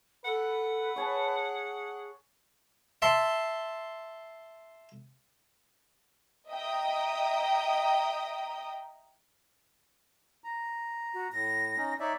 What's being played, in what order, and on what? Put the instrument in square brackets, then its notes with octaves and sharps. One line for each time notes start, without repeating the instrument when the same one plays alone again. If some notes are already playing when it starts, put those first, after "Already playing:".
[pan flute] A4 [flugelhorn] B4 [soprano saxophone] F#5
[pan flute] G#4 [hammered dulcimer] C#5 G#5 A5
[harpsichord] E5 A5 C6
[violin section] D#5 E5 G5 A#5 D#6
[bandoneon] A#5
[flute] F#4
[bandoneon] A2 [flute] A#6
[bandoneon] C#4 D#4
[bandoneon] D#4 D5 E5 [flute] C#5